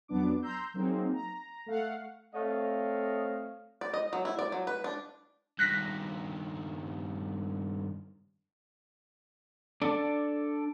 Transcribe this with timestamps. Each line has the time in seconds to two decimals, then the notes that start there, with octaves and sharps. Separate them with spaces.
0.08 F2 F#3 B3 D4 D6
0.42 A#5 C6 E6 G6
0.74 F#3 A#3 C4 D#4 G#4
1.13 A#5
1.66 A3 F5 F#5
2.35 A3 C4 C#5 D#5 F5
3.81 D5
3.93 D#5
4.13 F#3
4.25 E4
4.39 D5
4.52 F#3
4.67 B4
4.84 D4
5.59 G2 D#3 F#6 A#6 B6
9.82 D4 A4 D5